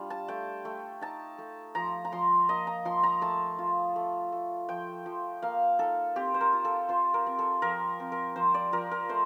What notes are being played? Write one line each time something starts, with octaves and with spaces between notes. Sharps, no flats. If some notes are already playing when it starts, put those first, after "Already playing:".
Already playing: G3 D4 F4
A5
A3 G5
A3
D#4 A5
A3
F3 A#5
A#5
F3 C6
A#3 D#5
A#5
F3 C6
A#5
A3 A5
F4
A3
A3
F3 G5
F3
A#3 F5
D#4 A4
C4 G4
C5
A#4
F4
A4
F4 C5
A#4
C4
A4
F3 A#4
C4
A#4
F3 C5
D5
F3 A#4
A#4
A3 C5